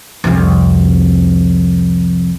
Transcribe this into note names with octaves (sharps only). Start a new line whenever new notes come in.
C2 F2